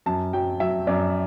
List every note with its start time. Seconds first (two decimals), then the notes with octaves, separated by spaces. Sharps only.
0.06 F#2 A5
0.33 F#3 G5
0.60 F#3 E5
0.87 F#2 D5